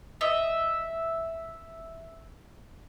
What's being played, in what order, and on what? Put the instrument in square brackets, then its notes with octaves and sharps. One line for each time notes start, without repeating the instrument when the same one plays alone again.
[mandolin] D#5 E5